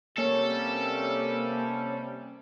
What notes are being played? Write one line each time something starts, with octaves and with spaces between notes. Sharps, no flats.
C3 G3 A#3 C#4 A4